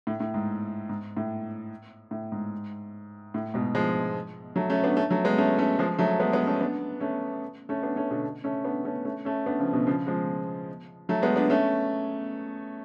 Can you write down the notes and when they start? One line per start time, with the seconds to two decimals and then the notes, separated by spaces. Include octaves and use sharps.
0.07 A2
0.20 A2
0.34 G#2
0.89 G#2
1.17 A2
2.11 A2
2.32 G#2
3.34 A2
3.54 G#2 B2
3.75 F3 G#3
4.56 F#3 A3
4.70 A3 C#4
4.84 B3 D4
4.97 A3 C#4
5.11 F#3 A3
5.25 G#3 B3
5.38 A3 C#4
5.59 A3 C#4
5.79 F3 G#3
5.98 F#3 A3
6.20 G#3 B3
6.33 G#3 B3
6.47 A3 C#4
6.60 B3 D4
7.01 A3 C#4
7.69 A3 C#4
7.83 B3 D4
7.96 A3 C#4
8.11 B2 D3
8.44 A3 C#4
8.65 B3 D4
8.85 A3 C#4
9.05 A3 C#4
9.25 A3 C#4
9.46 B3 D4
9.59 C#3 F3
9.73 B2 D3
9.87 C#3 F3
10.07 F3 G#3
11.09 F#3 A3
11.22 G#3 B3
11.36 B3 D4
11.50 A3 C#4